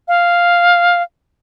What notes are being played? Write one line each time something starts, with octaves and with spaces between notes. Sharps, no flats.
F5